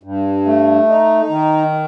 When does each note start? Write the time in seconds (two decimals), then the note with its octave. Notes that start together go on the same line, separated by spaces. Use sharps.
0.03 G2
0.46 A3
0.88 D#4
1.29 D#3